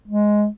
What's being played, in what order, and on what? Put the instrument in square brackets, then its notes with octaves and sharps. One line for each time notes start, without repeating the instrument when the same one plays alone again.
[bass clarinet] G#3